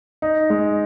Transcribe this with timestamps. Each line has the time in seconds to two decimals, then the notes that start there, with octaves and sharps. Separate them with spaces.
0.22 D#4
0.50 G#3